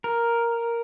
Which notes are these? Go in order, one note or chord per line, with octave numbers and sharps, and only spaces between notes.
A#4